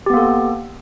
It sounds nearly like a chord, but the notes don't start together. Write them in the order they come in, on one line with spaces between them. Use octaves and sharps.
G4 B3 A#3 A4